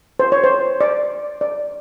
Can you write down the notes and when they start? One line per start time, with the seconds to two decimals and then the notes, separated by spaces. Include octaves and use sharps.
0.19 C5
0.32 C#5
0.44 C5
0.81 D5
1.41 D5